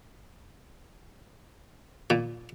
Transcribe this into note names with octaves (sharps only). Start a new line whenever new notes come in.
A#2